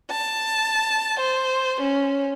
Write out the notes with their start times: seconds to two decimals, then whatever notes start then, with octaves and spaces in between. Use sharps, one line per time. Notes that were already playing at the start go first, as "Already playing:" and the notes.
0.11 A5
1.19 C5
1.81 C#4